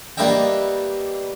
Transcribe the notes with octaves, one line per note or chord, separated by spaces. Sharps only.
G3 A#3 B4 D#5 E5 G5